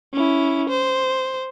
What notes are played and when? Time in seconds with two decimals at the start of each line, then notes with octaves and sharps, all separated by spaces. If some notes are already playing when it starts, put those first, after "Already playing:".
0.13 C#4 E4
0.69 C5